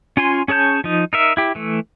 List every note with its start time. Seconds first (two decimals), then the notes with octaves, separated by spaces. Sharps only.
0.17 C#4 F4 G#5 C6
0.48 C#4 G#4 C#5 A5 G6
0.84 F3 D#4
1.13 D#4 A#4 E5
1.37 E4 G4
1.55 E3 A3